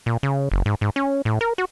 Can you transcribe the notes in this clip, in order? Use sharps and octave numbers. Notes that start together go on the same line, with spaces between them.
A#2
C#3
F#1
G#2
G#2
C#4
A2
A#4
F#4